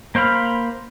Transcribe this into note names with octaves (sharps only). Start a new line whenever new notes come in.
A#3 C5 F5 B5 F6